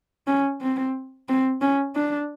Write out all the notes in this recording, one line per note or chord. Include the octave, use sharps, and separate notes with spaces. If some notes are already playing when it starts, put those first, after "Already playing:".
C#4
C4
C4
C#4
D4